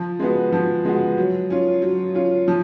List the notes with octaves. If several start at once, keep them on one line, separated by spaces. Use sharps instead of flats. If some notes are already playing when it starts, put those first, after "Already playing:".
Already playing: F3
G#3 B3 F#4
F3
G#3 B3 F#4
F#3
C#4 F4
F#3
C#4 F4
F3